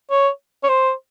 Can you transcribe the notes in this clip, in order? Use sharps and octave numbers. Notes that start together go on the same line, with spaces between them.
C#5
C#5
C5